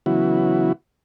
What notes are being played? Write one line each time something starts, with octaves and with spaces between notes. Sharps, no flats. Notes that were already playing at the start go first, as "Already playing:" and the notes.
C#3 E3 F#3 B3 E4 F#4